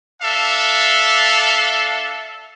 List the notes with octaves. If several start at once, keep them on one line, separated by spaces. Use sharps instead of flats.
D4 A4 E5 F5